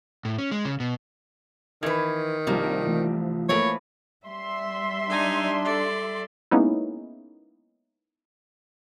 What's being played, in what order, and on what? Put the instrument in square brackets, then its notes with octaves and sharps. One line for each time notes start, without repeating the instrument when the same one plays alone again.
[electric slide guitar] A2
C#4
G#3
C#3
B2
[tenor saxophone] D#3 [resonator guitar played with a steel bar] E3 B4 [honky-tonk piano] G#6
[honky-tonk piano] C2 F3 [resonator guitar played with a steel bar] G3 A#3
[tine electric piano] E3 A3 F4
[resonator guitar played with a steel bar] E3 B4 [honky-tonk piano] F3 A3 A#3 [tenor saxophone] C#5
[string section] G3 E5 C6
[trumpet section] D4 [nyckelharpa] D#4 G#5
[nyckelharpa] A4 D5
[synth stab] G#3 A#3 B3 C#4 D#4 E4